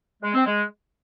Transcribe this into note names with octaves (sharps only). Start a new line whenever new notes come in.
G#3
C4
G#3